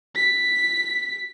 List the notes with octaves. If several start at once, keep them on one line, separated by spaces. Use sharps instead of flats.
B6